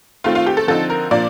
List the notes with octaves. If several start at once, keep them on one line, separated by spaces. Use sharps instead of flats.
D#3 A3 C4 F4
F4
G4
A4
D3 F3 C4 D#4 A4
A#4
A#2 F3 A#3 D4 D5